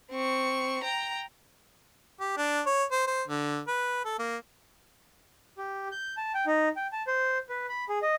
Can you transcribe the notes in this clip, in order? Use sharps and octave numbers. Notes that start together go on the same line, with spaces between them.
C4 C#6
G5 A#5
G4
D4
C#5
C5
C5
D3
B4
A4
A#3
G4
G6
A5
G5
D#4
G5
A5
C5
B4
B5
G#4
D#5